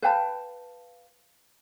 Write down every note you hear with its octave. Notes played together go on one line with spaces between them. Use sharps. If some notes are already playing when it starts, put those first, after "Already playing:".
B4 F5 G5 A5